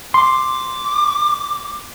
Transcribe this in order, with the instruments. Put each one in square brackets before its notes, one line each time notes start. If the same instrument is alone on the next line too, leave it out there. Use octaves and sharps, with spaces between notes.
[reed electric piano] C6 [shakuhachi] D6